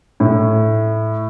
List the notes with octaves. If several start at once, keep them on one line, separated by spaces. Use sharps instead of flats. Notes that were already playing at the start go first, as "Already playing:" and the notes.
A2